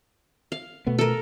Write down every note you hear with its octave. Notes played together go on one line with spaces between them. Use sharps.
F5
B2 A3 B3
A4 A#4